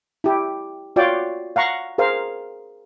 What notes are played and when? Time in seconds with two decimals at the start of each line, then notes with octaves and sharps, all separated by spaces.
0.24 E4 G4
0.96 F4 F#4 C#5 D5 F5 G5
1.56 F5 F#5 A#5 C#6
1.98 G#4 A#4 C5 F5